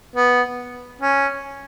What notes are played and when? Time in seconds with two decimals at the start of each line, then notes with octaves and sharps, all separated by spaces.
0.16 B3
1.01 C#4